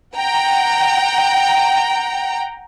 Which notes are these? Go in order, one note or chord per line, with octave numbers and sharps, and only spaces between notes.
F#5 G5 A#5